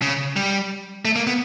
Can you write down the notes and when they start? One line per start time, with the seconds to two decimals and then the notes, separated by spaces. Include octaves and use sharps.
0.02 C#3
0.36 G3
1.05 A3
1.16 A#3
1.27 B3